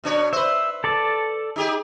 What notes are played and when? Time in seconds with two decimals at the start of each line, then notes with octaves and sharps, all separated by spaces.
0.04 B2 D4 C#5
0.33 B4 C5 E5
0.84 A4 D5 A5
1.56 D#4 G4 G#4